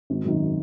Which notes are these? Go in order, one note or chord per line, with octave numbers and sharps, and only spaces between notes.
G#1
F#2 D#3